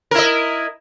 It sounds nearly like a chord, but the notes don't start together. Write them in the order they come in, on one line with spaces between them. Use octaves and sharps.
A#4 E4 D#5